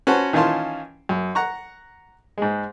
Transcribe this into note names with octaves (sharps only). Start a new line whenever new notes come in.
C#4 F#4 B4 C5 F#5 A5
D#3 E3 C#4 F4 A5 C6
F#2
F#5 A#5 C#6
G#2 G#3